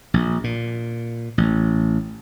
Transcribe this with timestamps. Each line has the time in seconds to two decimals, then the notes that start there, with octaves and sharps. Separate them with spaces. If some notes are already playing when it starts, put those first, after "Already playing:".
0.14 A#1
0.44 A#2
1.38 A1